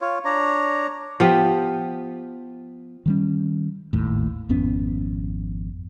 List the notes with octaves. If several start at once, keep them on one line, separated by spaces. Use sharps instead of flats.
F4 C#5
D4 C#5 D5 A#5
F3 B3 G4
D#3 G3 C#4
G#1 D#2 A2
G#1 F2 B3 C#4